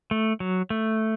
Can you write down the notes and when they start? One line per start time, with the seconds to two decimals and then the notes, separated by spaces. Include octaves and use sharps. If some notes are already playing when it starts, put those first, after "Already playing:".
0.11 A3
0.40 F#3
0.70 A3